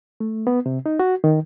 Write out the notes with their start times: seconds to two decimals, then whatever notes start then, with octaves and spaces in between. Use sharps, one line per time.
0.20 A3
0.47 B3
0.66 C3
0.86 D#4
0.99 F#4
1.24 D#3